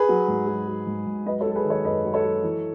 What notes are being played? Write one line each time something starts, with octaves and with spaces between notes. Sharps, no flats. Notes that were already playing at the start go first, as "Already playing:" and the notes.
Already playing: G#4 B4
F#3
G#2
F#3
F#3
G#2
G#2
F#3 B4 D#5
A4 C#5
F#3
A4
G#4 B4
D#3
A4 C#5
F#2 B4 D#5
F#3
A4 C#5
F#3
E3